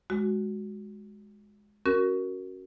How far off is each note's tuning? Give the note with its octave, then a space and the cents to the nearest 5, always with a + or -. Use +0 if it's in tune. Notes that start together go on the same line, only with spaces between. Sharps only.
G#3 +0 F#4 +0
C#4 -5 F#4 +10 A#4 +0